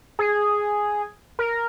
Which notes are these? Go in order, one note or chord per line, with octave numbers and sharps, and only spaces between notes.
G#4
A#4